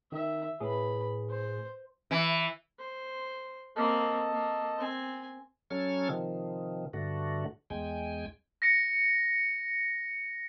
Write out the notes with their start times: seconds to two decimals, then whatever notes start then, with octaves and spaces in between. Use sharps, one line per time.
0.12 D#3 E5
0.60 A2 G#4 B4 B5
1.30 C5
2.11 E3
2.79 C5
3.76 A#3 C4 A4 D#5 A5
4.33 A#3
4.77 C4 G#5
5.70 F#3 C#4 A4 F6 G#6
6.09 C3 D#3 F3
6.93 G2 D3 A3 F#4
7.70 E2 G#3 G5 G#5
8.62 A#6 C#7